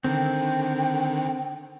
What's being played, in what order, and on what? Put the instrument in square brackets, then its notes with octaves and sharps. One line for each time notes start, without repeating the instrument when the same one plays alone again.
[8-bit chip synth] D3 D#3 [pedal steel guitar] C4 [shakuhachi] G5